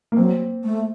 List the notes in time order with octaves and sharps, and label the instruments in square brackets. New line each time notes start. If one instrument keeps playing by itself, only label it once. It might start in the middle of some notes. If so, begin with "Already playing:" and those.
[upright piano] A#3
[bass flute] F#3 [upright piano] C4
[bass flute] A3